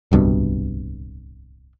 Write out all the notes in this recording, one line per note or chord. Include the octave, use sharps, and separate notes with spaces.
D1 C2 G2 B2